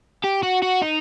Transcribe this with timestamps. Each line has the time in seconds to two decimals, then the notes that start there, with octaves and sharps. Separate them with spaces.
0.24 G4
0.43 F#4
0.62 F#4
0.82 D#4